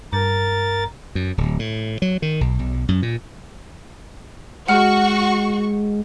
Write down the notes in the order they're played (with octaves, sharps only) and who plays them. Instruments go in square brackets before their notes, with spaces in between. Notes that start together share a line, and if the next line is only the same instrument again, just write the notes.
[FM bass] G2 [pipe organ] A#4 A6
[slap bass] F#2
D1
A2
F#3
D#3
B1
B1
F#2
A#2
[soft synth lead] G#3 [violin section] F#4 C#6 [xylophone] F#5 F6